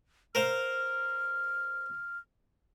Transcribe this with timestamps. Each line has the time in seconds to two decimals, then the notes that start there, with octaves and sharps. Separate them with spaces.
0.35 A#4 C5 F5 F6